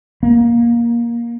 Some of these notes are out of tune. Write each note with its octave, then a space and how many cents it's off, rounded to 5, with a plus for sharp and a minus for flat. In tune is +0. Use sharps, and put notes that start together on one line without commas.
A#3 +15